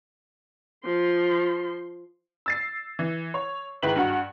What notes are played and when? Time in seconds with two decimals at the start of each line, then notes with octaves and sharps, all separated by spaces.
0.84 F3 C6
2.46 E6 A6 C7
2.99 E3
3.34 C#5
3.83 G#2 D#3 E4 B4 F#7
3.96 G2 F#4